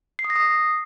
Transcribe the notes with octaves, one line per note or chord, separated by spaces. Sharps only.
C7
D#6
A#6
D#6